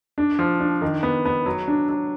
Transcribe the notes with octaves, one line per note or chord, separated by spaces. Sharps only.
D4
F3
D4
D#3
B3
B3
F#3
D4
F#3